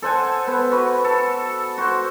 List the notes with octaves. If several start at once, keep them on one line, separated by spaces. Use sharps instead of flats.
A4 C5 F#5 G#5
B3
F#4 B4
A4
F#4 C5